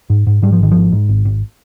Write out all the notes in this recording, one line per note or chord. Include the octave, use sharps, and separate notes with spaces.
G#2
G#2
G#2 G3
F3
G#1 D#3
G#2 F3
G#2
G#1
G#1